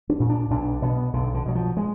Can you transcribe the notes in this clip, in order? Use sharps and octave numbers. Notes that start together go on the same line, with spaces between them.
D4
A#2
D4
B1 D4
B2 B3
B1 D3
D3
B2 F#3
F3
G#3